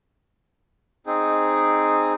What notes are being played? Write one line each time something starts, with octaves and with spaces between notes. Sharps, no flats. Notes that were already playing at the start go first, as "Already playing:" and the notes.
C4 D#4 G#4